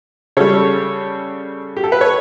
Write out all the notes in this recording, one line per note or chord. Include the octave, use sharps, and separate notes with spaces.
C#3 G3 A4 C#5
G4
A4
B4
C#5